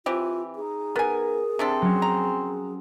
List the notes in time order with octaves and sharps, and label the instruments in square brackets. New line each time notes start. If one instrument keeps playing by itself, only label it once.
[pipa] E3 C4 G4 [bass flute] F4
[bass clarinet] D#4 [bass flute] G#4
[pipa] B3 G#5 [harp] A#4
[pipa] C3 D4 A4 [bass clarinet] C4
[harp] F#3 C#4
[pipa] A#5